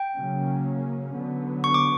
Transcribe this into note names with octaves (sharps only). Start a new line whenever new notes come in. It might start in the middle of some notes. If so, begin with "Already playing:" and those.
Already playing: G5
C#3 F#3 A#3 C#4
D3 F#3 B3
C#6
D6